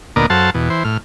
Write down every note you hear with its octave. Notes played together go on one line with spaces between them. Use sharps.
D2 A#2 B3 A#4 D5 D#5
F#2 A4 C5 F5 F#5 A5
E2 B2
E3 C5
A2 F6